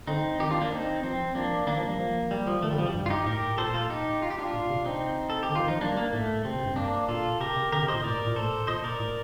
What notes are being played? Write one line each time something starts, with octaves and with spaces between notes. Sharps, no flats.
D3 C4 D#4
D#3 D#4 G4
D4 F4
A#3 D4
C4 D#4
F3 C4
F3 A#3 D4
D#3 A#3 D4
F3
A#3
G3
F3
G3
F3
D#3 A3
D3 G3
F3
C3 G3
G2
F4
D#4 G4
A2 G4 A#4
A#2 A4 C5
F4 A4
D#4 G4
F4
G4
D4 F4
A#2
C3
C4 D#4
A4
G4
D3
D#3 F4
F3 D#4
G3 A#3 D4
A#3
A2 A3
C3 C4
C3
G2
A#3 D4
A#2 F4 A4
C3 G4 A#4
C3
D3 G4 A#4
C3
C5 D#5
A#2
A2 A#4 D5
A#2
A2 A4 C5
A#2 C5 D#5
A#4 D5
A2